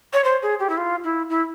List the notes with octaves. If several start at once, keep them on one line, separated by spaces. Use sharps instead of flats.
C#5
C5
G#4
G4
E4
F4
E4
E4